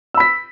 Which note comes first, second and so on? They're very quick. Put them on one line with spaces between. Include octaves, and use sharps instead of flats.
E6 B5 B6